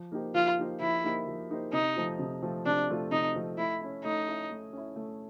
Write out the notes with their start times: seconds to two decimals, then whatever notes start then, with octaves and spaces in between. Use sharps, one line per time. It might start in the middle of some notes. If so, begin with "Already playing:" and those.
Already playing: F3
0.12 A#3 D#4 G4 C5
0.34 F3 F4
0.58 A#3 D#4 G4 C5
0.81 F3 E4
1.04 A#3 D#4 G4 C5
1.27 F3
1.50 A#3 D#4 G4 C5
1.73 C3 D#4
1.96 F3 A3 C4 F4
2.19 C3
2.42 F3 A3 C4 F4
2.66 C3 D4
2.89 F3 A3 C4 F4
3.11 C3 D#4
3.35 F3 A3 C4 F4
3.58 A3 E4
3.81 C#4 E4
4.04 A3 D#4
4.28 C#4 E4
4.51 A3
4.73 C#4 E4
4.96 A3